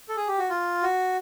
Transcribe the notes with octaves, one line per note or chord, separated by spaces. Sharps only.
A4
G#4
G4
F#4
F4
F#4